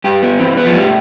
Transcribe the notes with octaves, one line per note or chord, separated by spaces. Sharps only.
G2 G4
B3
E3 C4
B3
F3
A2 G3